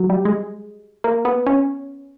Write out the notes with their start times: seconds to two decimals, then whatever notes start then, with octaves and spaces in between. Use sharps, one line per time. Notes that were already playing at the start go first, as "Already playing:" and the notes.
Already playing: F#3
0.10 G3
0.25 G#3
1.04 A#3
1.25 B3
1.46 C#4